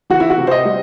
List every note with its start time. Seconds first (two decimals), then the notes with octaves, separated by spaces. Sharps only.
0.10 E3 F#4
0.20 E4
0.30 F#4
0.37 C3
0.47 C5
0.51 D#5
0.65 G3